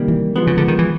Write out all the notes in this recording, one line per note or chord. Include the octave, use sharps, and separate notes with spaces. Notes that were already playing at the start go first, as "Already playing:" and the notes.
Already playing: C3 D#3 G3 A#3
E3
F3 G#3 B3
C#3
D3
D#3
E3